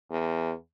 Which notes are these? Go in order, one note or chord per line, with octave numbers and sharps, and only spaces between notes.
E2